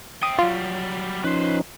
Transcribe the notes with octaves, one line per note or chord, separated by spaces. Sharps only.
E5 G5 D#6
F#3 G3 F4
F3 C#4 D#4 B4 C5